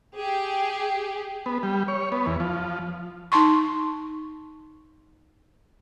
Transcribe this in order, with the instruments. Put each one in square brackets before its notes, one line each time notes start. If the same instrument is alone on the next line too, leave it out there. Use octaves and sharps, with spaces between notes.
[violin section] G4 G#4
[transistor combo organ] B3
G3
C#5
B3
E2
F3
[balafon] D#4 A5 C6 C#6